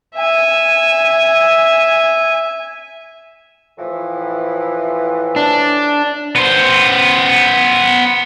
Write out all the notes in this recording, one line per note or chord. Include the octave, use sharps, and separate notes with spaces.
E5 G#5
A2 E3 F3
D4
B3 C5